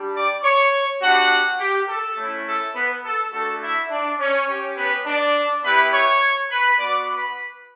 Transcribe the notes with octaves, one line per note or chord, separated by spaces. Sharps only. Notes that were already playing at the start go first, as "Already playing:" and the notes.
Already playing: G3 D4 G4
D5 D6
C#5 C#6
B3 D4 F#4 G4 F#5
G4
A4
A3 C#4 E4
A4
B3 B4
A4
A3 D4 F#4 A4
E4 E5
D4 D5
C#4 C#5
C#4 G4
B3 B4
D4 D5
B3 E4 G4 B4 B5
C#5 C#6
B4 B5
B3 F#4 D5 D6
B4 B5